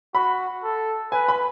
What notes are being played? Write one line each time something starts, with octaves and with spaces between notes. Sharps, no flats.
F#4 B5
A4
B4 G#5
B5